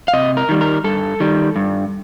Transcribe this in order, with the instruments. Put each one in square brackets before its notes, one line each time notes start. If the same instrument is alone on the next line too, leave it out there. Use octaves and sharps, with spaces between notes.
[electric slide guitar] F5
C3 D#5
A#4
D#3 G3
A#4
G2 A4
D#3 G3
G2